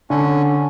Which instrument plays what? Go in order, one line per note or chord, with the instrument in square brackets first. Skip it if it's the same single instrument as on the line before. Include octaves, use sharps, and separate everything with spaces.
[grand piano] D3 [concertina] C#4